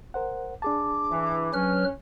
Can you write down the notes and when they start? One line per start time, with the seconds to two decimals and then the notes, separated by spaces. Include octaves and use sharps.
0.14 A#4 C5 F#5
0.62 D4 G#4 A5 D6
1.10 E3
1.53 F#3 C#4 B4 F6